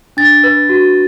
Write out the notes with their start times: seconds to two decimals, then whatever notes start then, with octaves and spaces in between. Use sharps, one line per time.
0.17 D4 A6
0.44 B4
0.69 F#4